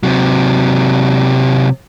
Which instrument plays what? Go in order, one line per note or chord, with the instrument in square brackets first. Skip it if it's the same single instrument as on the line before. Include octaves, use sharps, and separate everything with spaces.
[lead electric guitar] C3 F#3